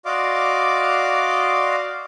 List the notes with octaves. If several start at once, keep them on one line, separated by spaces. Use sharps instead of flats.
F#4 D5 D#5 F5 C6 D6